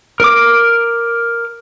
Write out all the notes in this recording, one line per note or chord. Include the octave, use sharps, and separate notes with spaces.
A#4 D6